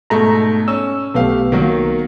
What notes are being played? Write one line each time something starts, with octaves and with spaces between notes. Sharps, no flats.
G#2 B2 A3 A#5
C#4 E6
B1 A3 B3 G4 F5
D#3 F#3 A#3